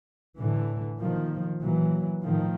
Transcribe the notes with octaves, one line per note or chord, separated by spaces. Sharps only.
A2 D3 E3
A#2 D#3 F3
A#2 E3 F#3
A2 D#3 F3